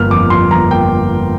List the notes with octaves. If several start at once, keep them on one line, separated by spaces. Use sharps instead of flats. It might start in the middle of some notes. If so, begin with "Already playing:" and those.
Already playing: G1 F3 A#3 F6
F2 D6
F3 C6
G1 A#5
A#3 G5